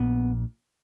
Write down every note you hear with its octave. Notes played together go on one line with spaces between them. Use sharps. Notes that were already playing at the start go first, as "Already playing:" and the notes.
Already playing: A#1 A#2 B3